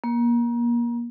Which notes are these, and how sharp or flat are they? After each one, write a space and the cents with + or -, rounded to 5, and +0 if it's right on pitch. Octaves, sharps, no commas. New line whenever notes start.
A#3 +30